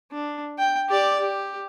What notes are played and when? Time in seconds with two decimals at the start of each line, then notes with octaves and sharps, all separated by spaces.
0.12 D4
0.59 G5
0.89 G4 D5
1.20 G4